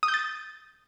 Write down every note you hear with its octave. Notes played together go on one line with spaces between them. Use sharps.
D#6
G6
A6